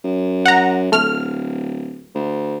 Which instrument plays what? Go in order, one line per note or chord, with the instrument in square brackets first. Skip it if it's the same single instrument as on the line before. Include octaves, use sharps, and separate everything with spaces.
[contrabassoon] F#2
[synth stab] F#5 A#5
[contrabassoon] D1 [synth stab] A3 F6
[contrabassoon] D2